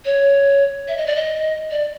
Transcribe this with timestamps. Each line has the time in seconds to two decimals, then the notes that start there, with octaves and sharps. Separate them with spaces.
0.05 C#5
0.88 E5
0.97 D#5
1.07 D5
1.16 D#5
1.71 D5